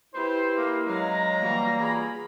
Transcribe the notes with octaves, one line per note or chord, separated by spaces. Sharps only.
E4 G4 B4 C5
A#3
F#3 G#3 C#4 F5 A#5
E3 G3 A#3 F#4
F4 G#4 B5